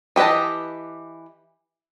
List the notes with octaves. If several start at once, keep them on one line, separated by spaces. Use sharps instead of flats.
E3 G4 B4 D#5 A5